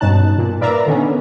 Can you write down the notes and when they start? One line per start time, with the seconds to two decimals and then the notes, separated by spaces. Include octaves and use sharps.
0.01 G2 B2 C#4 D#4 A5 F#6
0.38 A#2
0.60 A#4 B4 D5 E5 F5 A#5
0.86 D3 D#3 B3 C#4